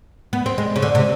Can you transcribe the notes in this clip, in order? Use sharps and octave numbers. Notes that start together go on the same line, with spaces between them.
B3
C4
G#3
C#3
D3
C3